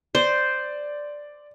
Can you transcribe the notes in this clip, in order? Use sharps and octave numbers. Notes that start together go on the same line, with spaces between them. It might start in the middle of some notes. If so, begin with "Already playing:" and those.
C5 D5